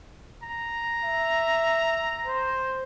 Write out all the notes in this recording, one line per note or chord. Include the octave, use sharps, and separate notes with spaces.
A#5
E5
C5